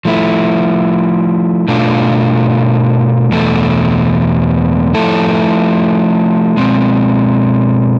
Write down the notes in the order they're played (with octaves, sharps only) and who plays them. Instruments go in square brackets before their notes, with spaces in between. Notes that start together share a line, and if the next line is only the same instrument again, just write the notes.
[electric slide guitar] F3 A3 E4
B2 A3 D4 F4
E2 B2 A3
F3 A3 E4 A4
B2 G#3 C4